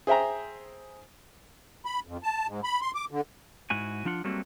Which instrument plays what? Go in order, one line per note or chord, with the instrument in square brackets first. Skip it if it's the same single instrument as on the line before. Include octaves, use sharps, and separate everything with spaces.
[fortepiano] G#4 C5 E5 G5 A#5
[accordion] B5
F2
A5
G#2
B5
C6
D6
D3
[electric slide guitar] G#2 E4 F#4 G#5
F3 D4 F4 F#5
F#3 G3 A3 A#3 C4 F#4